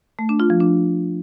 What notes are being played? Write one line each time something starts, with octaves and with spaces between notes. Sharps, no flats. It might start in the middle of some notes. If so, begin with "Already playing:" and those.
A3
D4
F4
F3
D4